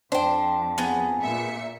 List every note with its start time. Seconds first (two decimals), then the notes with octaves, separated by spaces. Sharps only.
0.12 F2 D4 C5 G5
0.78 B3 G#4 A#5
1.22 A#2 E5 C#7